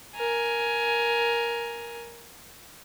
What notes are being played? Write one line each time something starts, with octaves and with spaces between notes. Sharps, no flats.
A#4 G#5